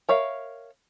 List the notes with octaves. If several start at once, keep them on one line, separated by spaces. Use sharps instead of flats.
A#4 C#5 E5 F5